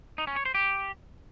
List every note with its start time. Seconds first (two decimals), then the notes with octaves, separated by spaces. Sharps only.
0.18 D#4
0.27 C#4
0.36 C#5
0.45 C5
0.55 G4